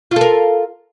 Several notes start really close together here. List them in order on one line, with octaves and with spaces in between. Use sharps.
F4 A4 A#4